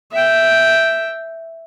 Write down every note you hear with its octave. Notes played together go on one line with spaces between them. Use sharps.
E5 G5